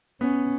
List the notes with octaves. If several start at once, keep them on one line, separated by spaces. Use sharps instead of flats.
B3 C#4